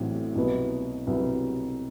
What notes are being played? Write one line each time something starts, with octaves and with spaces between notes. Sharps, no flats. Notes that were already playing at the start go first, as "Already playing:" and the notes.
Already playing: A1 A2 F#3 C4
C2 B2 F#3 B3
C2 B2 F#3 B3